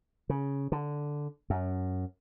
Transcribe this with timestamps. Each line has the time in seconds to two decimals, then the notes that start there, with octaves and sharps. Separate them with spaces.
0.29 C#3
0.72 D3
1.50 F#2